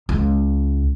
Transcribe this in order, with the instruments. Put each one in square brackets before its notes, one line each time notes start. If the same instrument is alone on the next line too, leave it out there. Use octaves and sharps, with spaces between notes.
[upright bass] C#2